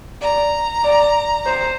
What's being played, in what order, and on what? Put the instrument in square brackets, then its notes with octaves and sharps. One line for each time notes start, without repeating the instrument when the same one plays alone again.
[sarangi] D5 [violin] A#5
[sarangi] D5
C5